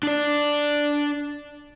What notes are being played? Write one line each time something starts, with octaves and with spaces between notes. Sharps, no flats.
D4 D5